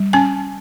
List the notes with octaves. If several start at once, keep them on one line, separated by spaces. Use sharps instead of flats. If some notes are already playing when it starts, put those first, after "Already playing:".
Already playing: G3
C#4 G#5